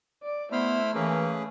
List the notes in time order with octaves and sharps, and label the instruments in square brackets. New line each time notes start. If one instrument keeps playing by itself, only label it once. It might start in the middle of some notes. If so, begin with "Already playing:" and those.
[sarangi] D5
[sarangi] A3 [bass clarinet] B3 [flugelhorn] E4 [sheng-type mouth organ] C5 B5 F6
[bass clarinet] E3 [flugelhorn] A#3 [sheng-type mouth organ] C#4 G#4 B4